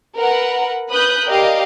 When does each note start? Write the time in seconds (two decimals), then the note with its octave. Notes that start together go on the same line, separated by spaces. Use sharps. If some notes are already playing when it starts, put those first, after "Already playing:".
0.18 A#4 B4 F#5
0.90 B4 B5 D#6 F#6 G6
1.27 G4 A#4 D5 D#5 F5 G5